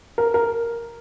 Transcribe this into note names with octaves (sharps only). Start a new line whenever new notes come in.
A#4
A#4